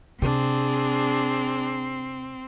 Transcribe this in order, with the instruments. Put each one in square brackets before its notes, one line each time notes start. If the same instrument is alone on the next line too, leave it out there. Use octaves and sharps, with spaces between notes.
[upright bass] C3 [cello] C4 [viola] D4 G#4